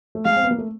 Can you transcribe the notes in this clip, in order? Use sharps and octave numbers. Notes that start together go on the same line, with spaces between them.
A3
G#3 F5
C4
B3
A#3
A3